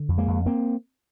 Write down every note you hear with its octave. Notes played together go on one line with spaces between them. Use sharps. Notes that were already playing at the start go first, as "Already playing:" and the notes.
Already playing: D3
F2
G#3 A#3
F2
A#3 C4